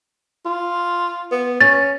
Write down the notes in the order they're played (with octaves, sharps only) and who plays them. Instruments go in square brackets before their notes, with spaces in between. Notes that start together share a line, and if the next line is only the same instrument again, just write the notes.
[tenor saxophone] F4
B3
[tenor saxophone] C#4 [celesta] A6